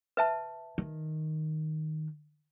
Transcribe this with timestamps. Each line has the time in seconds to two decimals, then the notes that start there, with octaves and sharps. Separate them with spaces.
0.17 B4 E5 A5
0.78 D#3